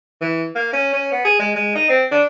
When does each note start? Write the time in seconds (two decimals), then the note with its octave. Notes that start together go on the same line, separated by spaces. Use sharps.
0.21 E3
0.55 A#3
0.73 C#4
0.93 C#4
1.12 B3
1.25 G#4
1.39 G#3
1.55 G#3
1.75 D#4
1.89 C4
2.12 D4